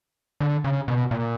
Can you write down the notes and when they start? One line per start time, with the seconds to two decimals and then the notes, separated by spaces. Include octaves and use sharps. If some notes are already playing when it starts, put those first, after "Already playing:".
0.40 D3
0.64 C#3
0.88 B2
1.11 A#2